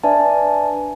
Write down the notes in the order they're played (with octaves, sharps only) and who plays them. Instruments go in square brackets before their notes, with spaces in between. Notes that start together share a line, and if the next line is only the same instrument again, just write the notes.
[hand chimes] D4 B4 D5 E5 G#5 A5